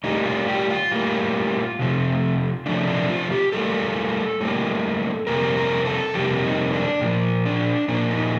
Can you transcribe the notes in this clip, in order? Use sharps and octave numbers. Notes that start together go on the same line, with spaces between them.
A2 G3 A#3 D#4
F4
G4
F4
A2 G3 A#3
C3 F3 A3
C3 F3 A3 D4
D4
F4
G4
A2 G3 A#3 A4
A2 G3 A#3
F2 C3 G3 A#3 A#4
A#4
A4
F2 C3 G3 A#3 G4
D#4
D4
A#2 F3 A#3 C4
D4
A#2 F3 A#3 D4
D#4